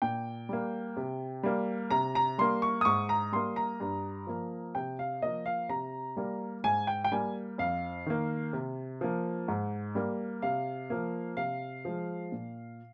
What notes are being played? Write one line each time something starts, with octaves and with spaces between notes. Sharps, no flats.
A#2 G5
G3 A#3
C3
G3 A#3
C3 A#5
A#5
G3 A#3 C6
C#6
D#6
G#2 C#6
A#5
G3 A#3 C6
A#5
G2
F3 A#3
C3 G5
F5
F3 A#3 D#5
F5
C3 A#5
G3 A#3
G#2 G#5
G5
G5
G3 A#3 G#5
F2 F5
D#3 A#3
C3
F3 A#3
G#2
G3 A#3
C3 F5
F3 A#3
C3 F5
F3 G#3
A#2